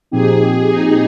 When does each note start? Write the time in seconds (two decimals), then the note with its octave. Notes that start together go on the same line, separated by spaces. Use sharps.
0.11 A#2 F3 C4 D#4 G4 G#4
0.69 D#4